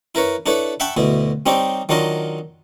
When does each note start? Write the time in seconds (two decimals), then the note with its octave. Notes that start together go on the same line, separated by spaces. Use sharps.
0.15 E4 A#4 B4 C#5
0.46 D4 E4 A4 B4 C#5
0.80 E5 F#5 G5 A5 B5 C#6
0.97 D2 B2 E4
1.46 G3 C4 D#4 G4 C#5
1.89 D#3 F#3 D4 F4 D#5